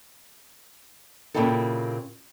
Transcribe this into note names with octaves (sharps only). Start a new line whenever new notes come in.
A#2 C#3 C4 E4 G4 A4